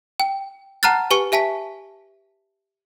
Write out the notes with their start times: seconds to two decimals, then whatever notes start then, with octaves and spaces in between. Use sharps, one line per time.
0.20 G5
0.83 F#5 A5 A#5 F6 F#6 A6
1.11 G4 B4 G#5 C#6 C#7
1.32 G4 E5 G#5 A5 B6